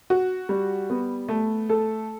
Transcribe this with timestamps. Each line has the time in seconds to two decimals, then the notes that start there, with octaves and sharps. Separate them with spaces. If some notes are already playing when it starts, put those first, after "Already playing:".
0.10 F#4
0.49 G3
0.90 B3
1.29 A3
1.69 A4